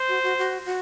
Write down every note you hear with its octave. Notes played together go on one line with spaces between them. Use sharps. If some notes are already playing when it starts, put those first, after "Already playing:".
Already playing: C5
F#4
F#4
F#4
F#4